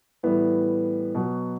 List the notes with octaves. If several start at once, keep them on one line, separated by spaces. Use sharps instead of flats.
A2 E3 G3 B3
B2 F#3